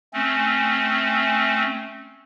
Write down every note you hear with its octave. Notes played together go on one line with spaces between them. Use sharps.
A3 C4 C#4